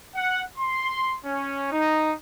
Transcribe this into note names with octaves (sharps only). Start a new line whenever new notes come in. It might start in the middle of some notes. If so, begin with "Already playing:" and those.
F#5
C6
C#4
D#4